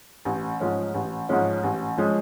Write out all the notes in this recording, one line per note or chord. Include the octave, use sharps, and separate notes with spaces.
A1
G#2 F3 G#3 C#4
A1
G#2 F3 G#3 C#4
A1
F3 G#3 C#4